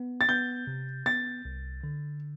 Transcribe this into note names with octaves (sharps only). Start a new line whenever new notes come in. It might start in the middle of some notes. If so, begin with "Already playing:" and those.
Already playing: B3
A6
B3 G6
C3
B3 A6
C2
D3